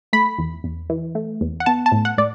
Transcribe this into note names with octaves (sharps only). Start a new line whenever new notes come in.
A3 B5
E2
E2
E3
A3
E2
F#5
B3 A5
A5
A2
F#5
A2 D5